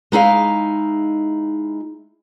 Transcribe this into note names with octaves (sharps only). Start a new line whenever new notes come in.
G#3 D#4 E4 F5